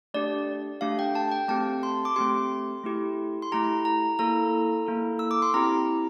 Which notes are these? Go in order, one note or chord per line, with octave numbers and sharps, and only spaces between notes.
A3 D4 G4 D5
A3 D4 G4 F5
G5
A5
G5
A3 C4 G4 A5
C6
D6
A3 C4 G4 C6
A3 E4 G4
C6
A3 E4 G4 A#5
A#5
A#3 E4 A4 A#5
A#3 E4 A4
E6
D6
C6
C4 E4 G4 A#5